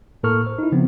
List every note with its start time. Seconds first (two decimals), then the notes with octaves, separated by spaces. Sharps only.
0.23 A2 A#3 A4 A#4 C#6 F6
0.46 C5
0.59 D#4 E4
0.72 C#3 F3 B3 C4